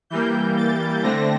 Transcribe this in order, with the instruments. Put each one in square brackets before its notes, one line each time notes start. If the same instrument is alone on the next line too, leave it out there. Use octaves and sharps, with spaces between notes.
[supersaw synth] E3 G3 A#3 G6
A6
D3 A3 C4 A#6